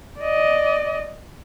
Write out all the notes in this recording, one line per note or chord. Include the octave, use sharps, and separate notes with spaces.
D5 D#5